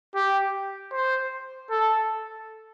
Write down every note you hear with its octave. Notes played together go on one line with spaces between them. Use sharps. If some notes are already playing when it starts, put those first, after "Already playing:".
G4
C5
A4